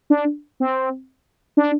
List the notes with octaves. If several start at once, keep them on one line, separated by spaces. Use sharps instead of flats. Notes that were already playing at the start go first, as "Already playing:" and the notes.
D4
C4
D4